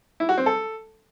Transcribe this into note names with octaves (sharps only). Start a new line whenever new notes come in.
E4
F#4
C4
A4